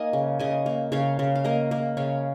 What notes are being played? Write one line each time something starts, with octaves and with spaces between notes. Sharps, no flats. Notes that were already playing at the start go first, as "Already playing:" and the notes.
Already playing: A#3 D#4 D#5 G#5
C#3
C#3 D#5 G#5
A#3
C#3 C#5 F5
C#3
F5
A#3 A#4 D#5
A#3
C#3 C#5 F5